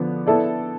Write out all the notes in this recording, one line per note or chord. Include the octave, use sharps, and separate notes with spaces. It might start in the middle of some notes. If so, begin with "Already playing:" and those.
Already playing: D3 F3 B3
B3 E4 A4 D5